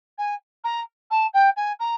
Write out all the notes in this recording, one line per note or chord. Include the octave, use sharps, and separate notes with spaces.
G#5
A#5
A5
G5
G#5
A#5